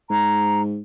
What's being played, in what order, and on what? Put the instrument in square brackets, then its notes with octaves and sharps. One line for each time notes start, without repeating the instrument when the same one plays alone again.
[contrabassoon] G#2 [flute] A#5